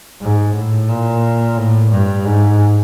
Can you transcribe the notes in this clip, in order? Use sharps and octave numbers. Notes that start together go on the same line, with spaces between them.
G#2
A2
A#2
A2
G2
G#2